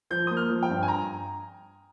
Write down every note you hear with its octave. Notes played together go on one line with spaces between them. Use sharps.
F3 G6
A#3 D#6
F6
F3
G5
G2
G#5
A#5